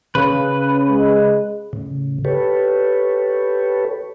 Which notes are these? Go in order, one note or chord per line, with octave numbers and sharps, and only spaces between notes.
C#3 B4
G#3
A2 C#3
G4 A4 B4 C#5